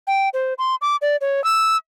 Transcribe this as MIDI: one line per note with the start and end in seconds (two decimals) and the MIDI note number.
0.07 0.29 79
0.34 0.54 72
0.58 0.75 84
0.82 0.96 86
1.02 1.16 74
1.21 1.43 73
1.44 1.77 88